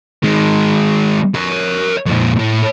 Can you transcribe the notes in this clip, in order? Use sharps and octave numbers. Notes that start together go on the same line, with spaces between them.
D#3 G#3
A#4 C#5
F2 A#2
A2